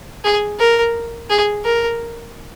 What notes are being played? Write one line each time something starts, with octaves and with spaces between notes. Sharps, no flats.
G#4
A#4
G#4
A#4